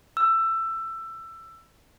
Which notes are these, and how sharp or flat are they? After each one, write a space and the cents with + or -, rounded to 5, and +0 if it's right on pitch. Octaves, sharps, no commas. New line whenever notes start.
E6 +20